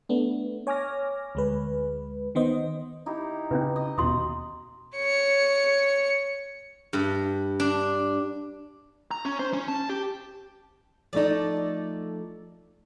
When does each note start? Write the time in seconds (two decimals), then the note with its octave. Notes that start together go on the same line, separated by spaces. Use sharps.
0.09 A3 B3 D4
0.67 C#5 G#5 D6 F6 A#6
1.35 D2 G#3 B4
2.35 D#3 B3 C5 D#5
3.06 D#4 E4 G4
3.51 C#3 C#4 D4 B4
3.76 D#5
3.98 E1 D#2 B2 F#4 C6 D#6
4.95 C#5 C#7
6.93 G2
7.60 D4
9.11 A#5
9.25 C#4
9.39 C5
9.53 C#4
9.68 A5
9.89 G4
11.13 F3 A3 D#4 A4 D5